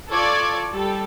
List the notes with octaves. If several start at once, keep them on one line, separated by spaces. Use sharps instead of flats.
F4 A4 D5 C#6 D6 G#6
G3 A4